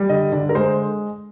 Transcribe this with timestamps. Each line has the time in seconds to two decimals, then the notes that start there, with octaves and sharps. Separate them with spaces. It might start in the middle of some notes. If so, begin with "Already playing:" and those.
Already playing: G3
0.09 D3 D#5
0.32 D3 D5
0.49 A#4
0.55 G#3 C5